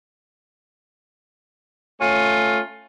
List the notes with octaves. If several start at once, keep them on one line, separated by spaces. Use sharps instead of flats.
A3 C#4 F4